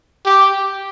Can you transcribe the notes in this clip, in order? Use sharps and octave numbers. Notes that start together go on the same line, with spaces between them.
G4